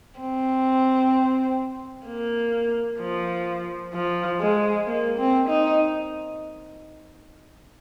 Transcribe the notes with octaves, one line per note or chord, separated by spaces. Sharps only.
C4
A#3
F3
F3
G#3
A#3
C4
D#4